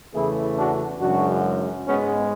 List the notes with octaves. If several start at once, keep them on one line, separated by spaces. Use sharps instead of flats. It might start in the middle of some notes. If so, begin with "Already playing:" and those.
E2 C#3 E3 A3 E4 G#4
D4 F#4
F#2 C#3 E3 G#3 D4 F#4
G#2 G#3 B3 C#4